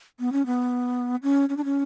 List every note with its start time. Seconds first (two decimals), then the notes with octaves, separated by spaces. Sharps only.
0.20 B3
0.32 C#4
0.46 B3
1.23 C#4
1.49 C#4
1.57 D4
1.64 C#4